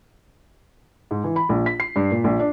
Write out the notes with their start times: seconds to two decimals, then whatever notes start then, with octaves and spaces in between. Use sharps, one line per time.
1.11 G#2
1.24 E3
1.36 B5
1.49 A#1
1.66 B6
1.80 C7
1.96 G2
2.11 A#2
2.24 A#1
2.40 D4